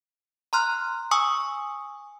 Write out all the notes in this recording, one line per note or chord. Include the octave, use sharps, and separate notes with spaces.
A#5 C6 F6 F#6
G#5 C#6 D#6 E6